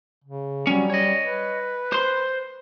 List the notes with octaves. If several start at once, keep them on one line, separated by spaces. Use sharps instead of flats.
C#3
F#3 G3 C#4
C#5 D#5
B4
C5 C6